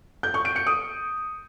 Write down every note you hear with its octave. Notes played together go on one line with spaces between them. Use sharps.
G6
C#6
D7
C#7
D#6